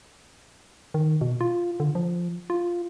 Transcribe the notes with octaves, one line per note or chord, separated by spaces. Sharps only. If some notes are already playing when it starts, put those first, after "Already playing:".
D#3
B2
F4
D3
F3
F4